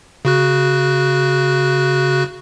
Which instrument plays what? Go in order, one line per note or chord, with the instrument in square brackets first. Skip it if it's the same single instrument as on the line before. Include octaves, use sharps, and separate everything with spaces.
[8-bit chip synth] C#3 F#4 F#6